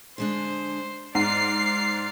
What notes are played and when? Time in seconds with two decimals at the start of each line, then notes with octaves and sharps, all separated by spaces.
0.18 D3 G#3 D4 C5
1.15 G#2 D5 D#5 F6 C7